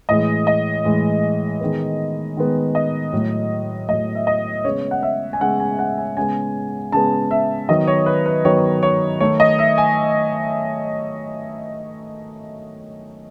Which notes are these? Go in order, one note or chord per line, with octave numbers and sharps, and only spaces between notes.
A2 E3 G#3 D#5
D#5
A2 E3 G#3
D#3 G#3 B3
D#3 G#3 B3
D#5
A2 F#3 A3
A2 F#3 A3 D#5
E5
D#5
C#3 G#3 B3 C#5
F#5
E5
G#5
C#3 G#3 B3 F#5
G#5
F#5
G#5
C#3 G#3 B3 G#5
C#3 G#3 B3 A5
E5
D#3 F#3 B3 D#5
C#5
B4
B4
D#3 F#3 B3 C#5
C#5
D#3 A3 C#5
D#5
E5
G#5